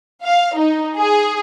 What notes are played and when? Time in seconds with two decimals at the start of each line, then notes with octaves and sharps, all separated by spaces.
0.24 F5
0.56 D#4
0.95 G#4